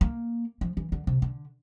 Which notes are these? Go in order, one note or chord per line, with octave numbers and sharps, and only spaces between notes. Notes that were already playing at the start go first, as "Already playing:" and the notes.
A#3
F3
E3
D3
C3
D3